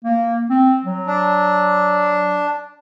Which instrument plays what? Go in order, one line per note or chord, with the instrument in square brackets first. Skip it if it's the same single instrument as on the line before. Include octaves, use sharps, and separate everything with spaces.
[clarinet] A#3
C4
F#3
[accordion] D4